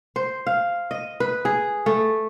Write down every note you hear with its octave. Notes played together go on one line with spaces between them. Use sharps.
C5
F5
D#5
B4
G#4
A3